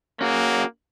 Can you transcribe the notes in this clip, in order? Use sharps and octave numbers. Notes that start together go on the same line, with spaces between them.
A#3 C#4 F#4 G#4